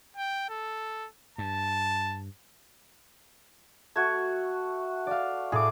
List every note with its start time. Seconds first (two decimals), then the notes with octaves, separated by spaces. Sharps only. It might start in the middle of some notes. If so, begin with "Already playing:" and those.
0.17 G5
0.49 A4
1.38 G2 A5
3.96 A3 F#4 G#6
5.07 D5 F5
5.52 A2 G#4 D6